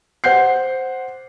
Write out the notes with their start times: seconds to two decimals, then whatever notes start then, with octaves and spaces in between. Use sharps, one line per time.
0.24 C5 F#5 G6 C7